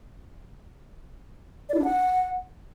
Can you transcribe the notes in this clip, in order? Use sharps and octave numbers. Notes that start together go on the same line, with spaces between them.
D5
E4
D4
F#5